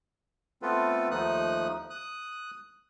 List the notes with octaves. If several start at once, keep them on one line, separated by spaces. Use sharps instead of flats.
A3 B3 C4 F4 A4 B4
D#2 F3 A3 D#4 D#6 F#6
D#6 F#6